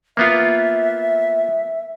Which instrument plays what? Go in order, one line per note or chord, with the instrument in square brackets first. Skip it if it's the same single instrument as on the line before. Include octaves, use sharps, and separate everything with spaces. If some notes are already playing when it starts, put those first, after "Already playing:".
[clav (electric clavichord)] A#3 B3 F4 [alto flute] E5